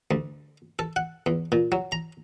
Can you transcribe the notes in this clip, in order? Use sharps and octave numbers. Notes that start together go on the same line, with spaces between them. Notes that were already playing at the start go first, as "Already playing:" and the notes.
D2
A4
F#5
E2
A#2
F#3
A#5